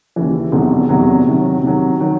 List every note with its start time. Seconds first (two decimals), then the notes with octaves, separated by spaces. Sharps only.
0.16 D#2 C#3 E3
0.52 E1 E2 C3 D#3 F#3
0.89 E1 E2 C3 D#3 F#3
1.26 C3 D#3 F#3
1.63 C3 D#3 F#3
2.00 D#3 F#3